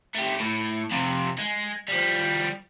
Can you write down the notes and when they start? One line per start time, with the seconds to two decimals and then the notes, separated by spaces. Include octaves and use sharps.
0.15 A3 G4
0.40 A2
0.91 F2 C3
1.38 G#3
1.88 F3 G3